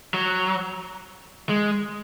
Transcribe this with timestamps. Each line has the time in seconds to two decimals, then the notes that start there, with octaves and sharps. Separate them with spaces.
0.14 F#3
1.49 G#3